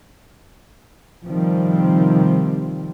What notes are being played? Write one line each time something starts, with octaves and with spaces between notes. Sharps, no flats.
C3 D#3 F3 G3 C4